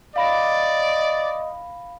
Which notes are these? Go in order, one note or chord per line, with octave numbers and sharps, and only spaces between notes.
D5 D#5 F5 B5 A#6